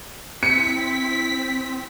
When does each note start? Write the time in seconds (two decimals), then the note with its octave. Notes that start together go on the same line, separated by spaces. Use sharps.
0.43 C4 E4 B6 C#7